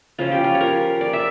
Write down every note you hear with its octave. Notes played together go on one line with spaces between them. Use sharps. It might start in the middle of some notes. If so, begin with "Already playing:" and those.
C#3 F3 C#4 F4
G4
F4
C#5
A#4
D5
E5